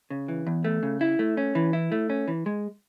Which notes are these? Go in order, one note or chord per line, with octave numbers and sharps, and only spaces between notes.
C#3
E3
E2
A3
C#3
E4
A3
C#4
E3
E4
A3
C#4
E3
G#3